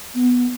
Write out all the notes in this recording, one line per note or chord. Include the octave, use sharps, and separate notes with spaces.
B3